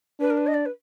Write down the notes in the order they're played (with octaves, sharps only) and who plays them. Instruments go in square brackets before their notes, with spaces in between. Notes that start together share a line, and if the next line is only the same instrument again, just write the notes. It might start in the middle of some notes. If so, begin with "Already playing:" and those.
[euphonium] D4 [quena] B4
[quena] A#4
B4
D#5
D5
B4